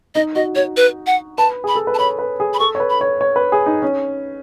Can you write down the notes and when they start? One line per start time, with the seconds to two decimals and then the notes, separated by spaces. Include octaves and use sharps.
0.15 D#4 D#5
0.35 F#4 D#5
0.55 F#4 C#5
0.77 B4
1.06 F#5
1.38 B4 A5
1.64 G#4 B5
1.75 A4
1.87 B4
1.94 A5
1.98 C#5 B5
2.19 B4
2.40 G#4
2.54 B5
2.59 A4 C#6
2.75 C#5
2.80 B4
2.90 B5
3.01 C#5
3.21 C#5
3.36 B4
3.52 G#4
3.66 D#4
3.82 C#4